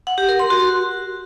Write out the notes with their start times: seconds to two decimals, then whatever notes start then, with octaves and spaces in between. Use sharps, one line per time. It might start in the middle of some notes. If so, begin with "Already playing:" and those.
0.07 F#5
0.18 G4
0.29 A#4
0.39 C6
0.50 F#4